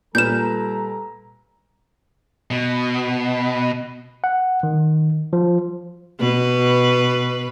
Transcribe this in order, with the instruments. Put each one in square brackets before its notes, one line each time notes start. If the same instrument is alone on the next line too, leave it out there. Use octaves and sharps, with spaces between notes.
[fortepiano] A#2 B4 F6 [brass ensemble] G3 A4 A#5 [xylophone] G6 E7
[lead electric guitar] B2
[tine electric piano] F#5
D#3
F3
[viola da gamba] B2 B4